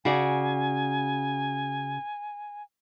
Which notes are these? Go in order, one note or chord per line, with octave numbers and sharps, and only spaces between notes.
C#3 F#4 D5 G#5